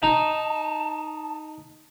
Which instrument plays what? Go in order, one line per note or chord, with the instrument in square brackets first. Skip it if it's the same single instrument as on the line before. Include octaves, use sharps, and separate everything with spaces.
[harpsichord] D#4 [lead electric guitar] A5